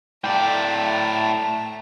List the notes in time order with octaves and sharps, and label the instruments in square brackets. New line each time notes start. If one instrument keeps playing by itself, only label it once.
[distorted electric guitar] A2 D5 [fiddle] A3 A#5 [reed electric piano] G5 [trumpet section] A5